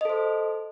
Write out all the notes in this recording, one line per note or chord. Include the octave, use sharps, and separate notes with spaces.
A4 C5 D#5